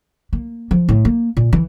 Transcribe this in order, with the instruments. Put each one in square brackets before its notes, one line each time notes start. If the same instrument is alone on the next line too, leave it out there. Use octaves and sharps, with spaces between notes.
[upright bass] A#3
F3
A2
A#3
A#2
E3